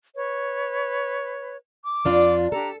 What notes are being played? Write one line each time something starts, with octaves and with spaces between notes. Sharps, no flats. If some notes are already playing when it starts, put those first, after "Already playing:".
B4 C#5
D6
F2 D4 F4
D4 G4 A4 A#5